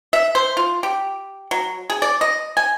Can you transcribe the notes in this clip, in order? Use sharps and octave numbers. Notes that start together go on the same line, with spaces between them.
E5
C5
F4
G4
F#3
G#4
D5
D#5
G#5